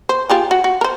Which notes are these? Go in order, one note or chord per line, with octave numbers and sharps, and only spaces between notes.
C5
F4 G4 G#4
F#4
F#4
A#4 C5